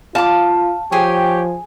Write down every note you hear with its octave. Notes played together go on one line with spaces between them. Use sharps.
F4 F5 A5 D6
F3 G4 G#4 C#5 G5 G#5